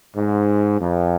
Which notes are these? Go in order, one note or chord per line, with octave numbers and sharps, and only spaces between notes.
G#2
F2